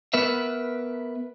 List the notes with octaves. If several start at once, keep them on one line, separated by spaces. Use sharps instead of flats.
B3 A#4 B4 E5